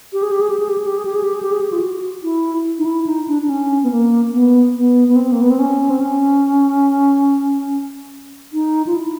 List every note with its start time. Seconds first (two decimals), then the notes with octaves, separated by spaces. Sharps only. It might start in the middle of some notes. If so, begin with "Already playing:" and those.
0.13 G4
0.22 G#4
0.31 G4
0.41 G#4
0.50 G4
0.60 G#4
0.69 G4
0.78 G#4
0.87 G4
0.97 G#4
1.05 G4
1.15 G#4
1.24 G4
1.34 G#4
1.43 G4
1.52 G#4
1.61 G4
1.72 F4
1.81 F#4
2.23 E4
2.78 D#4
2.85 E4
3.06 D#4
3.28 D4
3.42 D4
3.49 C#4
3.83 B3
3.91 A#3
4.33 B3
4.75 B3
5.08 B3
5.16 C4
5.32 A#3
5.41 B3
5.50 C4
5.59 C#4
5.90 C4
6.01 C#4
8.53 D#4
8.87 F4
8.94 E4